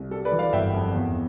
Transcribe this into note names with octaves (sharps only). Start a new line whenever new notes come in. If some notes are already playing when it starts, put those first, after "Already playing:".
Already playing: C2
G3 A4
B4 D5
E3
D5 F5
G1 E5 G5
F2
E2